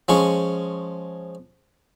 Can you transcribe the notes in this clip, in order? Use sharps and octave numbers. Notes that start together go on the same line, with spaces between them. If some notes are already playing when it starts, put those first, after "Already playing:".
F3 G#3 C#4 C#6